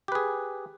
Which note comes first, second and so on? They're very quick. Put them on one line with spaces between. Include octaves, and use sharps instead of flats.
G4 B4 G#4